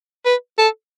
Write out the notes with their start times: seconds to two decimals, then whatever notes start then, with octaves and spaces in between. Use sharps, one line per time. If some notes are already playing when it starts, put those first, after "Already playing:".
0.25 B4
0.58 A4